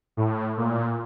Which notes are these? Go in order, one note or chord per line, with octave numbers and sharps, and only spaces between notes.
A2
A#2